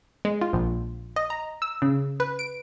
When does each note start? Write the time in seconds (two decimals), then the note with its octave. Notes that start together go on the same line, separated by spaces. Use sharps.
0.25 G#3
0.41 F4
0.53 A#1
1.16 D#5
1.30 A#5
1.62 E6
1.82 C#3
2.20 B4
2.39 D7